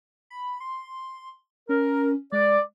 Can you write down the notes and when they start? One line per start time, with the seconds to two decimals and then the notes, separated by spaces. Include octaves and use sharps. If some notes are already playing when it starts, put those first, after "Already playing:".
0.30 B5
0.60 C6
1.69 C#4 A#4
2.32 G#3 D5